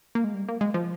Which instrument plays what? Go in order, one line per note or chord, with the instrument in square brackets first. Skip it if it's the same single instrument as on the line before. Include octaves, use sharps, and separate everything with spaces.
[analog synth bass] A#3
G#3
G3
A#3
G#3
F3